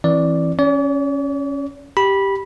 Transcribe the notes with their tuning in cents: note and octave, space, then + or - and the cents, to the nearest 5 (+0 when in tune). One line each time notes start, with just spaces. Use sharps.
E3 +0 C4 +30 D5 +0
C#4 +0 D5 -45
G4 +0 B5 -15